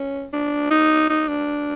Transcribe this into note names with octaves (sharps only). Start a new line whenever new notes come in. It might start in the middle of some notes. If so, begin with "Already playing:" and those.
Already playing: C#4
D4
D#4
D#4
D4